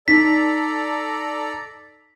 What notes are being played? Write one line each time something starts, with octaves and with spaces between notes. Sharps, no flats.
D#4 A4 D5 A#5 B6